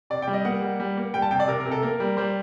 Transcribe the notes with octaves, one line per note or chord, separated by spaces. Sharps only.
C3 D5
G5
G3
D#5
A#3 F#5
G3
G3
A#3
G3 G5
A5
C3 G5
D5
C3 A#4
A#4
C3
A4
A#3 A#4
G3
G3 C5